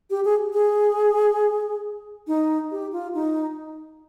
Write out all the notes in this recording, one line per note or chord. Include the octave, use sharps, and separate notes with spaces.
G4
G#4
G#4
D#4
G4
F4
D#4